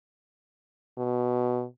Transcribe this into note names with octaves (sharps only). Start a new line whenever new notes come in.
B2